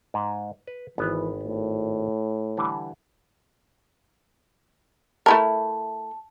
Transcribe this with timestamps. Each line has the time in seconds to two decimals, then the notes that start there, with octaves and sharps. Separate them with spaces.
0.14 G#2
0.67 B4
0.98 G#1 E3 B3
1.43 A2
2.57 D3 E3 G3
5.26 A3 E4 A#4 A5